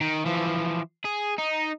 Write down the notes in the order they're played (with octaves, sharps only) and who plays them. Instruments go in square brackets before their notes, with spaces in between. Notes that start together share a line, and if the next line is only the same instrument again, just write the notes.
[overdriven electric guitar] D#3
E3 F3
G#4
D#4